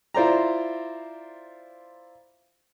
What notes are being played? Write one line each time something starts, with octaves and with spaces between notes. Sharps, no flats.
E4 F4 C5 D5 A#5